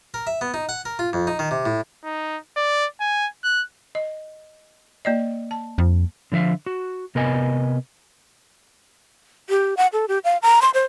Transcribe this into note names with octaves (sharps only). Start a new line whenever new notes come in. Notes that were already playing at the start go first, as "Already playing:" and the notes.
A#4
E5
B3
D#4
F#5
A#4
F4
F2
D#4
D#3
C3
A2
D#4
D5
G#5
F#6
D#5
A#3 D5 D#5
A5
F2
D3 F3 A#4 E5 F5
F#4
C3 B3 A#4 B4 D#5 G#5
G4
F#5
A4
G4
F5
A#5
C6
C5